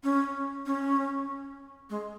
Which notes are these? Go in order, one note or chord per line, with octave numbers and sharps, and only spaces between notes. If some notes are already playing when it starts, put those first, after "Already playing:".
C#4
C#4
G#3